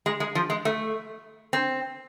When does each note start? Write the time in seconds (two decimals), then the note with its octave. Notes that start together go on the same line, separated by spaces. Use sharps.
0.06 G#3
0.20 G#3
0.35 F3
0.50 G#3
0.65 A3
1.53 C4